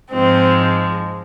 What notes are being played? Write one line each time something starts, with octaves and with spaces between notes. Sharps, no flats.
G#2 F3 G#3 C4